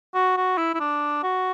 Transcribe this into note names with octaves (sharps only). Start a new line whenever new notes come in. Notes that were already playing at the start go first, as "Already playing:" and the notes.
F#4
F#4
E4
E4
D4
F#4